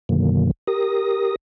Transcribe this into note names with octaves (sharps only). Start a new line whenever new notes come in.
F#2 B2 D3 D#3 F#3 A#3
G4 A#4 D#6 A#6